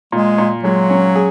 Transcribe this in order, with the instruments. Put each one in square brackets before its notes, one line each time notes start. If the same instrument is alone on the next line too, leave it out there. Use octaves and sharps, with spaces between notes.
[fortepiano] A#2 [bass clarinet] G#3
[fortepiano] A#2
[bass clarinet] F#3 [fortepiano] G#3
[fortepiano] C#4
G#4